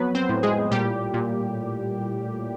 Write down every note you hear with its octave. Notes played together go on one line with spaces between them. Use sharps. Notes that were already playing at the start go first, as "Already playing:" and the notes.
Already playing: F2 F#3 B3 B4
C4 C5
A2
G#3 G#4
A#2 G3 G4
A#2